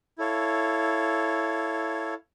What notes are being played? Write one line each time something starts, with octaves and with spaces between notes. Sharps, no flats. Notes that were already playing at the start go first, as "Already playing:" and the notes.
E4 A4 C#5 F5